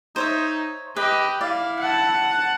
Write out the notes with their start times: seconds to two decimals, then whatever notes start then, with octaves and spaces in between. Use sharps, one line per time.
0.16 D#4 C5 C#5 E5
0.96 G4 B4 D#5
1.41 E4 D5 F5
1.80 F#5 A5